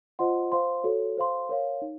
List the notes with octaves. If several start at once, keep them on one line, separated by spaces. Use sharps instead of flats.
F4 C5 D#5 F#5 C6
C5 F5 C6
F#4 A4 C#5
C5 F5 C6
A#4 C#5 F5
D#4